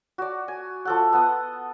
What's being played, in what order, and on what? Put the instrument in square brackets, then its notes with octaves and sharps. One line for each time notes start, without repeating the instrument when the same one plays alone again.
[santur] F#4 D5
G#5
F3 A4 F#5
B3 F#5 D#6